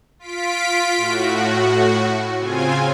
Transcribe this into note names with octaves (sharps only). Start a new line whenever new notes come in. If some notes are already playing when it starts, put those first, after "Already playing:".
F4 B6 D7
A2 F#4
C#3 C4 F4 G#5